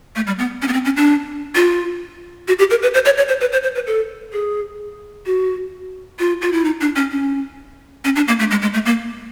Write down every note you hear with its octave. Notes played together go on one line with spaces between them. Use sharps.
A3
G3
B3
C#4
B3
C4
C#4
D4
F4
F#4
G4
A#4
B4
C5
C#5
C#5
C5
B4
C5
C5
B4
A4
G#4
F#4
F4
F4
E4
D#4
D4
C#4
C#4
C#4
D4
A#3
A3
G#3
G#3
A3
A#3